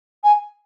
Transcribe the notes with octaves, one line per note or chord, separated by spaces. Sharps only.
G#5